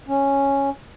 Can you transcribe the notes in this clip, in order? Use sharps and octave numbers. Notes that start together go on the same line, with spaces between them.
C#4